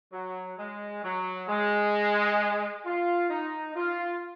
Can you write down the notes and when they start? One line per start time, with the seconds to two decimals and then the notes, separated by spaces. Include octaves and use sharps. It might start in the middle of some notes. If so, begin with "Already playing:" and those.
0.13 F#3
0.59 G#3
1.03 F#3
1.49 G#3
2.85 F4
3.30 D#4
3.75 F4